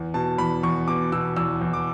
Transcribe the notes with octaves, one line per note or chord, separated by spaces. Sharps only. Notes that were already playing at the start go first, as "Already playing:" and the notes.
Already playing: E2
B2 A5
E2 B5
E2 C#6
B2 D6
B2 E6
E2 E6
E2
D6